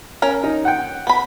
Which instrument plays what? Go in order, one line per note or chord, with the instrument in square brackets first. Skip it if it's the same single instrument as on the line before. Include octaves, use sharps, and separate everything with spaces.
[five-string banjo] C#4 A#4
[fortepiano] D#4
F#5 G5
[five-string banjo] B3 B5